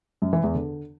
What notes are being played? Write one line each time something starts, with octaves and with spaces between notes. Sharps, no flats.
F#2
E3
E2
D3